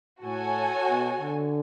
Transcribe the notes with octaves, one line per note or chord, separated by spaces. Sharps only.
A2 F#4 A4 C#5 G#5
B2
D3